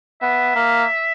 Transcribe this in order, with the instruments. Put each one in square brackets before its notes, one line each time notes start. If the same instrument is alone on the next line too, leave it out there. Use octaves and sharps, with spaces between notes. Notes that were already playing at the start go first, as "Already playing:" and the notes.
[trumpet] B3 [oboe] E5
[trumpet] A#3